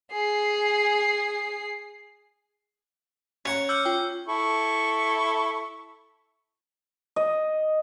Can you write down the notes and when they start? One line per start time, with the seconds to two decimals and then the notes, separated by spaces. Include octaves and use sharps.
0.12 G#4 C7
3.45 C#4 C#5 F#5 A#5
3.69 D6 E6 F6 G6 C#7
3.85 F4 G5
4.28 E4 A4 C#6
7.16 D#5